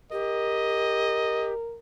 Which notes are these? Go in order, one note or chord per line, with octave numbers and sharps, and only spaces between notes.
G4 A#4 D#5